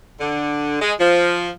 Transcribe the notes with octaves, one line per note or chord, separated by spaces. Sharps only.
D3
G#3
F3